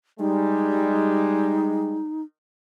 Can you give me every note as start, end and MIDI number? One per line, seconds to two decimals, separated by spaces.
0.20 2.02 55
0.20 2.02 56
0.20 2.22 63